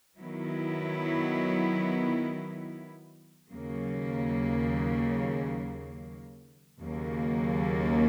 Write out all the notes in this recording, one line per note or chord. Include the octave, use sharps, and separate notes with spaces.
D#3 F#3 B3 E4
D#2 C#3 F#3 A#3
D#2 C#3 F#3 A#3